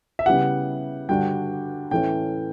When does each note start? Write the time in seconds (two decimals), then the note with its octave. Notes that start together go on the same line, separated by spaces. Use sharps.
0.19 E5
0.26 C#3 G3 B3 E4 G4 F#5
1.09 G2 D3 G3 D4 F#4 G5
1.91 A2 E3 A3 C#4 G5